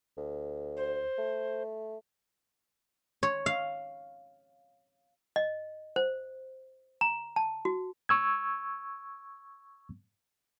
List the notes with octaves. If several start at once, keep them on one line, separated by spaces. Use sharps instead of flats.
D2
C5
A3
C#5
F5
D#5
C5
A#5
A5
F#4
C#6 E6 G#6